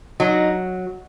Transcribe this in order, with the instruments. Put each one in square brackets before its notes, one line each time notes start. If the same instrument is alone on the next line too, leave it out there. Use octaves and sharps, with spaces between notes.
[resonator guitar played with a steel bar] F#3 D#4